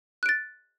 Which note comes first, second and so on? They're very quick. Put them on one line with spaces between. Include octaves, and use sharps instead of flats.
F#6 D7 A6